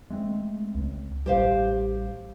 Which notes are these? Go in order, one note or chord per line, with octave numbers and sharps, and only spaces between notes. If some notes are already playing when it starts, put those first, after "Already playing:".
G#3 A3 C4
C#2
A1 G3 G4 C5 F5